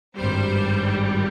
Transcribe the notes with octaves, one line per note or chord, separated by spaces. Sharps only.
G#1 G2 G3 C5